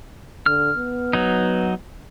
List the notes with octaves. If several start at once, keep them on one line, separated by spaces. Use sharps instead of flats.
D3 F6
B3
F#3 D#4